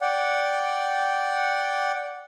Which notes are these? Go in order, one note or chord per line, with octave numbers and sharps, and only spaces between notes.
D5 F#5 G5